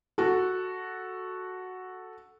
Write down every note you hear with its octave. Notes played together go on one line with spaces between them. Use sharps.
F#4 A4